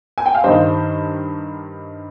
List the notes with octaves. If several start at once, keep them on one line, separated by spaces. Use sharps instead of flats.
G#5
G5
F5
G2 D#3 C5 D#5